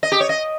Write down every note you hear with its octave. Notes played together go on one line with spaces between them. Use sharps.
D#5
G4
C#5
D#5